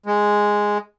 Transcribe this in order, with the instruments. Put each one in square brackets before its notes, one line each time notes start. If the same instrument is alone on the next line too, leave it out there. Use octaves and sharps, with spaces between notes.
[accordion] G#3